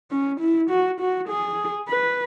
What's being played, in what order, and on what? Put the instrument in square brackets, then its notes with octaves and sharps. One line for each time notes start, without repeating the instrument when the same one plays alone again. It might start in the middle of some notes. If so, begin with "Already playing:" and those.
[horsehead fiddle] C#4
E4
F#4
F#4
G#4
B4